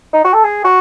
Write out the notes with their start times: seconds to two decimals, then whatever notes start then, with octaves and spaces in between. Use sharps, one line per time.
0.13 D#4
0.24 F#4
0.33 A4
0.44 G#4
0.64 F#4